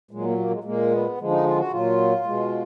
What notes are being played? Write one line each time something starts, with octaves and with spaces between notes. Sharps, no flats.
A#2 F#3 G#3
A#3
A#3
G#3
A#2 G#3 A#3
B3
D3 F3 G#3
D#4
F4
F#4
A#2 F#3 F4
B2 G#3